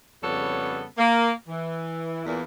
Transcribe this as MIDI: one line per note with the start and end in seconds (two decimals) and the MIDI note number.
0.23 0.83 41
0.23 0.83 49
0.23 0.83 55
0.23 0.83 59
0.23 0.83 69
0.23 0.83 73
0.98 1.30 58
1.48 2.24 52
2.26 2.43 40
2.26 2.43 46
2.26 2.43 52